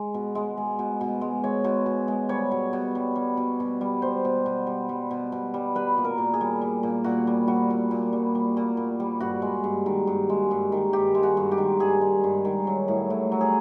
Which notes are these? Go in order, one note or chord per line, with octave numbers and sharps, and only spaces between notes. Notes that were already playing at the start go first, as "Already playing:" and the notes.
Already playing: G#3
B2
G#3
G#3
B2
B2
G#3
G#3 C#5
B2
B2
G#3
G3 C#5
B2
B2
G3
G3
B2
B2
G3
G3 C5
B2
B2
G3
G3
B2
B2
G3
G3 B4
A#2
A#4
A#2
G#4
G3
G3
A#2
A#2 F#4
G3
G3 F#4
A#2
A#2
G3
G3
A#2
A#2
G3
G2 F#4
G#3
G2
D#3
G2
G#3
G2
D#3
G2 G4
G#3
F#4
G2
G4
D#3
G2 G#4
G#3
G2
D#3
F#3
A2
A2
F#3
G#4